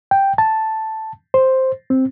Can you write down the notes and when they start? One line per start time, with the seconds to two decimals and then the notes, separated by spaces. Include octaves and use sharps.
0.11 G5
0.38 A5
1.34 C5
1.90 C4